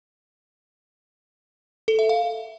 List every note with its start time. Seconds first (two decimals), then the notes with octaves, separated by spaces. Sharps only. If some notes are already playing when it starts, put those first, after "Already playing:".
1.88 A4
1.99 E5
2.09 F5